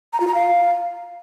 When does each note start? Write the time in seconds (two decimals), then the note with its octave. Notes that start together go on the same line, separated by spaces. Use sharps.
0.13 A#5
0.20 F4
0.27 A#5
0.35 F5